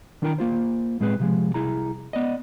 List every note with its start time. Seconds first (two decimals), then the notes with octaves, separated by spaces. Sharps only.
0.22 D#3 D4 E4 A#4 G5 A#5
0.38 A#3 F4 C5
1.00 A2 G#3 C4 G#4 B4
1.20 C3 F3 G#3
1.54 C2 E4 G#4 A#5
2.13 B3 D5 D#5